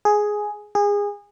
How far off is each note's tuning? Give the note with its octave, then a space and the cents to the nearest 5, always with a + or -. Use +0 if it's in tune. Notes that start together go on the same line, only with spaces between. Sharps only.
G#4 +5
G#4 -25